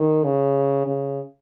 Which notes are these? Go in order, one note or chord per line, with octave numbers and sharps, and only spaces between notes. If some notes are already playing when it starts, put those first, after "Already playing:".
Already playing: D#3
C#3
C#3